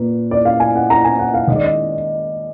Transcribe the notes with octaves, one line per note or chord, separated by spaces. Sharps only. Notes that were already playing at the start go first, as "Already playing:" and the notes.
Already playing: A#2 A#3 B4
D5
F5
G#5
F#5
A#5
G#5
F#5
F5
D#3 G#3 D#5
D5
D#5